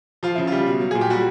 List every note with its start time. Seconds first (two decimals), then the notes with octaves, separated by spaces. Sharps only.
0.23 F3 F4
0.35 C#3 E4
0.47 G3 F4
0.66 B2
0.81 F#3
0.91 A#2 G#4
1.01 G4
1.10 G3 F#4